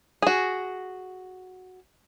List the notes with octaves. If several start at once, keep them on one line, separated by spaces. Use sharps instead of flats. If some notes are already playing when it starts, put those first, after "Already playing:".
F#4 G#4